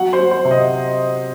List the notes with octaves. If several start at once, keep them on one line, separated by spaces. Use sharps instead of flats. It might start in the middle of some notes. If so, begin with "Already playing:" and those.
Already playing: F#3 F#5
C5
F#3
C5
C3
D#5